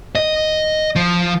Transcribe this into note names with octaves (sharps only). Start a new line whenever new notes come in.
D#5
F3